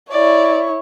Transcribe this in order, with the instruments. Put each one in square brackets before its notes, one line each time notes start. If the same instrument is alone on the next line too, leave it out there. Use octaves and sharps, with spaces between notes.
[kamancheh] E4 C#5 [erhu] D5